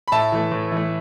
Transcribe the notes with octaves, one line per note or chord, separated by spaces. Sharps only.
B5
A2 E5 A5
E3 A3
A2
E3 A3